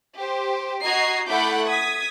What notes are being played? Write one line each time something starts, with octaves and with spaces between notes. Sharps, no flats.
G4 C5
F#4 D#5 A#5 G#6 C7
A3 E4 F#5 B5 D6 G6
D#6 G#6 B6